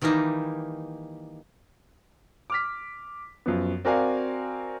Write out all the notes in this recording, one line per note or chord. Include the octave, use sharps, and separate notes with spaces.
D#3 E3 G3 A#3 D#4
D6 F6 B6
F#2 F3 B3
C4 F#4 A#4 D5 F5 G#5